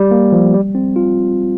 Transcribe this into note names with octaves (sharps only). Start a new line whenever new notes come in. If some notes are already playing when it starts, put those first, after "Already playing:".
Already playing: G3
A#3
F3
G3
C4
F4